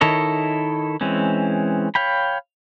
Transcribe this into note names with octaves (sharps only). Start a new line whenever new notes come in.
D#3 E4 A4 C#5 D#5
E3 G#3 C4 C#4
C#5 F5 G5 B5